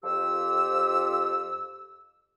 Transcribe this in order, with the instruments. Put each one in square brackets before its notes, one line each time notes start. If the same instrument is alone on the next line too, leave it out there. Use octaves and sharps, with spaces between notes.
[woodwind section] F2 F3 G4 C5 E6